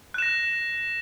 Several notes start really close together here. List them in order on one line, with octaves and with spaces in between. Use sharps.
F#6 E7 A#6